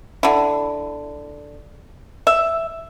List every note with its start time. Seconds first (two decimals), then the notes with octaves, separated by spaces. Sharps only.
0.23 D3 E4
2.27 E5